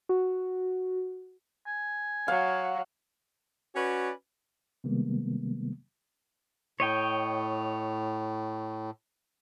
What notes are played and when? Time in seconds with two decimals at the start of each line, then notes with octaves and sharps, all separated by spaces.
0.09 F#4
1.66 G#5
2.28 F#3 F5
3.76 C#4 F#4 B4 C#5 D5
4.84 C3 D#3 G3 G#3 A#3 B3
6.80 A2 C#5 D#5 G5